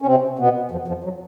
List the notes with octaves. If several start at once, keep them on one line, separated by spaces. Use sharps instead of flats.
C#4
C3 C4
B2 B3
F2 F3
F2 F3
F#3